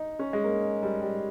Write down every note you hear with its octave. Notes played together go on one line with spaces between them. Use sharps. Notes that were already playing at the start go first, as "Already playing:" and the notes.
Already playing: D#4
C#4
G#3
A#3
G3
G3